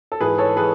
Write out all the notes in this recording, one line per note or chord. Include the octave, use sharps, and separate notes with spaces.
A4
G#2 E3 G#4 B4
A4 C#5
E3 G#4 B4